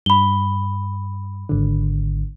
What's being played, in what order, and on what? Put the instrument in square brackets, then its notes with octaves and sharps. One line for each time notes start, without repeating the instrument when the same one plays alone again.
[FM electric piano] G2 [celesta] B5 G7
[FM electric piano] G#1 D3